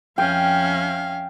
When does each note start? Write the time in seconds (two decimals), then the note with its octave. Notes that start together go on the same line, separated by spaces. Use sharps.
0.18 F2 C#4 E5 F5 G5